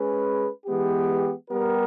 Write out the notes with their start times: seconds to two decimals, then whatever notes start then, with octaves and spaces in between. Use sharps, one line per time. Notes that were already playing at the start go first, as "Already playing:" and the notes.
Already playing: G#3 C#4 G#4 B4
0.66 E3 G#3 B3 G4
1.49 G3 B3 G4 A#4